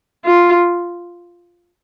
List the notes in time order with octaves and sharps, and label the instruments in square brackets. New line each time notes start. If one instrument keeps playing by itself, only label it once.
[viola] F4